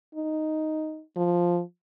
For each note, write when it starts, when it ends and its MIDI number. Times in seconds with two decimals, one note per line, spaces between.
0.15 1.02 63
1.17 1.61 53